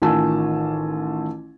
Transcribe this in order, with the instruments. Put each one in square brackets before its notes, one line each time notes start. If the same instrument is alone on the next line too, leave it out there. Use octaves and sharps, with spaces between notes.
[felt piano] A1 D#3 F4 G#5 A5 E6